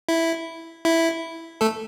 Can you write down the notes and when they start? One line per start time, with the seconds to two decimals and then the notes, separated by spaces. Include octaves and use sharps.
0.09 E4
0.85 E4
1.61 A3 A4